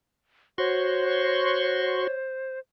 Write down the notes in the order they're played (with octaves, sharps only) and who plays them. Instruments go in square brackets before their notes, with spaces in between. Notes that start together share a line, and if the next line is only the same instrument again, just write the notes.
[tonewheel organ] F#4 C6 C#6 [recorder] C5 [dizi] C#5